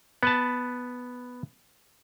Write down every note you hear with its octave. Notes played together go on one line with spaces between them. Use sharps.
B3 B4 A5